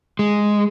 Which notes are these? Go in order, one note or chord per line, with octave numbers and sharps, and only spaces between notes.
G#3